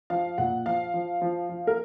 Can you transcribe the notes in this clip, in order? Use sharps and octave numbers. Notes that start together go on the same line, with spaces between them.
F3 F5
A#2 F#5
F3 F5
F3
F3
F3
A#4